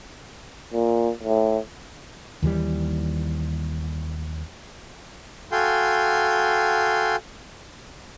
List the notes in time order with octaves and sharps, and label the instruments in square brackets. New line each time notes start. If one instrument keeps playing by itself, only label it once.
[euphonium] A#2
A2
[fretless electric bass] D#2 E3 F3 G3
[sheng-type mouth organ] F#4 A4 F5 G5 G#5 C6